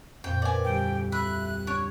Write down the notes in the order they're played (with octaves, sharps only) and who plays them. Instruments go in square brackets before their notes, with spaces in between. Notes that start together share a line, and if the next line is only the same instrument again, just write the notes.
[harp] F2 A#2 [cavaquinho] G5
[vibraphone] A#4 B4 [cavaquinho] D5 G#5
[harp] D2 [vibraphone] G3 G4 [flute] G5
[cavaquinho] E5 [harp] B5 [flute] F#6
[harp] D4 G#6 D7 [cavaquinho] C#5